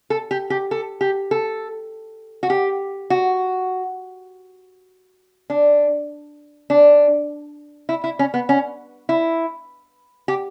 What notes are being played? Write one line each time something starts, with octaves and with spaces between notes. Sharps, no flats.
A4
G4
G4
A4
G4
A4
F#4
G4
F#4
D4
D4
E4
E4
C#4
B3
C#4
E4
G4